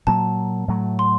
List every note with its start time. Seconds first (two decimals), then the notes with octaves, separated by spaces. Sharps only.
0.07 A#2 F#3 A#3 A5
0.68 A2 F#3 A3
0.99 C6